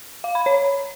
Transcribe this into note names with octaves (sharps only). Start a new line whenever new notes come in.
F5
B5
C#5